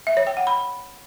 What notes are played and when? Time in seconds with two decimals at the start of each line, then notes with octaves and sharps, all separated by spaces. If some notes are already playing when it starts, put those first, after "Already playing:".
0.07 E5
0.17 C#5
0.27 G5
0.37 F#5
0.47 B5